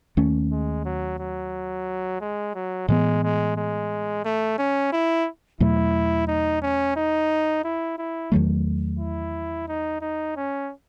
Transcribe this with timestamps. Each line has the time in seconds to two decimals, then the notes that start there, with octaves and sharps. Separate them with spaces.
0.17 D#2 D#3 A3 C#4
0.51 G#3
0.85 F#3
1.19 F#3
2.21 G#3
2.55 F#3
2.88 A2 E3 G#3 B3
3.23 G#3
3.57 G#3
4.25 A3
4.58 C#4
4.92 E4
5.60 E2 B2 F#3 A3 E4
6.28 D#4
6.62 C#4
6.96 D#4
7.64 E4
7.98 E4
8.32 E2 D#3 F#3 A3
8.99 E4
9.68 D#4
10.01 D#4
10.36 C#4